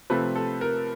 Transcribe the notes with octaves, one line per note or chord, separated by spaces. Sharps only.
C3 F3 A3 C4 B4
A4
A#4